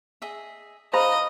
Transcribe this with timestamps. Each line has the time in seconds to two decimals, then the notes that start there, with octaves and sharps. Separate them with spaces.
0.22 G#4 D#5 E5
0.93 D#4 C5 D#5 F5 A#5 B5